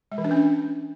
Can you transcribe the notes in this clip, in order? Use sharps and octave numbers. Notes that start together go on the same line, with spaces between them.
G#3
E3
D4
C#4